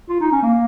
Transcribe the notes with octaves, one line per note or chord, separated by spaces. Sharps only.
F4
D#4
C#4
A#3